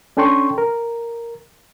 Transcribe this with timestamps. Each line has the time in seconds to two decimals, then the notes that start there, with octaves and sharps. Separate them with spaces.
0.17 C#4 D4 A4 G5 C6 C#6
0.58 A#4